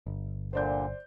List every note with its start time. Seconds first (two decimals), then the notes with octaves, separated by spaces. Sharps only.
0.07 G1
0.53 A#2 D3 C5 D5 G6